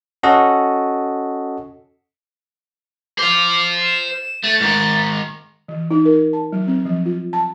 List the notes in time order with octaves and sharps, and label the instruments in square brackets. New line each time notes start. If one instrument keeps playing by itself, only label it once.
[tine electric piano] C#4 F#4 A4 D#5
[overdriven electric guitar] C5 F5 [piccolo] D6
[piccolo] E7
[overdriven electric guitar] A3 [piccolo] A6
[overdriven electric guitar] G#2 D#3
[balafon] E3
D#4
A#4
A5
F#3
C4
F3
F4
A5